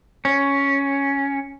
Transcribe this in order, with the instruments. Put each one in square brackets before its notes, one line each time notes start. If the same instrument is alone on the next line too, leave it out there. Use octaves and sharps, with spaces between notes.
[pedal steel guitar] C#4